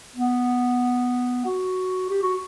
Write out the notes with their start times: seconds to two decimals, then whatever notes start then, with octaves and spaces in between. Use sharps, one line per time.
0.16 B3
1.46 F#4
2.10 G4
2.22 F#4